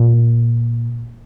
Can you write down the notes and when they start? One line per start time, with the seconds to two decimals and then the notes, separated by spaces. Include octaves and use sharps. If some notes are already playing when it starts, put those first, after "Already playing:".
Already playing: A#2